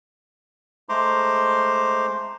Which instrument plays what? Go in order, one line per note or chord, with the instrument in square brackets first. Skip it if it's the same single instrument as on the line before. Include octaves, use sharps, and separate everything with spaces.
[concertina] G#3 A3 C5 A#5 C6 D6